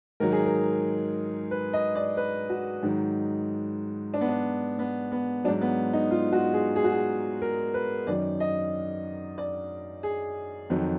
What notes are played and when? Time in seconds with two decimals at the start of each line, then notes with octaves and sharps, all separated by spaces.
0.20 G#2 D#3 F#3 A#4
0.32 G#4
0.46 A#4
1.51 B4
1.73 D#5
1.95 D5
2.17 B4
2.50 F#4
2.83 G#2 D#3 F#3
4.14 D4
4.21 B3
4.29 D4
4.79 B3
5.12 B3
5.44 F#3 D4
5.48 G#2
5.61 B3
5.93 D#4
6.11 F4
6.32 F#4
6.54 G#4
6.76 G#4
6.84 F#4
6.92 G#4
7.42 A#4
7.74 B4
8.07 F#2 D#3 F#3 D5
8.40 D#5
9.38 D5
10.03 G#4
10.70 F2 D#3 F#3